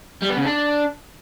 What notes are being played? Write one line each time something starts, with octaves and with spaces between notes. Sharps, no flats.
G3
B3
C#3
D4